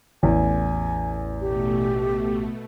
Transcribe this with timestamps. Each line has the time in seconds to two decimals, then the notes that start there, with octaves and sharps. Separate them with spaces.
0.23 A1 E2 G#5
1.41 B2 A3 G4